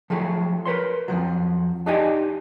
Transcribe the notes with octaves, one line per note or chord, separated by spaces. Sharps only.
F3 F#3 A3 G#4
A#4 B4 C#5 C6
F2 B2 F3 F#3
D4 D#4 G4 D5 D#5 G#5